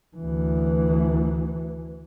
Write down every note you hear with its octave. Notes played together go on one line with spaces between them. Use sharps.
D2 E3